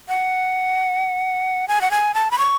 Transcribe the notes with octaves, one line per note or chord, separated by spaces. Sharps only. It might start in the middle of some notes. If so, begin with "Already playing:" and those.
F#5
G#5
F#5
G#5
A5
B5
C#6